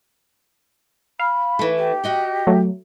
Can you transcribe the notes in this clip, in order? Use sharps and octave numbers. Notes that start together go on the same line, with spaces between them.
F5 B5
E3 A3
G4
F#4 D#5 G5
F#3 A3